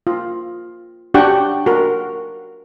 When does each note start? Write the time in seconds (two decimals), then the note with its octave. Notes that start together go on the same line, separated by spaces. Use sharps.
0.07 F4
1.14 D4 F#4 G4 F#5 G5 C#6
1.67 F#4 A#4